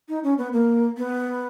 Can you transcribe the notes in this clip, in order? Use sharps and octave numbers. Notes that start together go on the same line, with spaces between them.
D#4
C#4
B3
A#3
B3